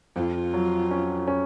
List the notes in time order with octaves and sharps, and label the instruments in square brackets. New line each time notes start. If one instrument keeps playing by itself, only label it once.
[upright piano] F2 [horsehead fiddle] F4
[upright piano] F#3
C#4
C#4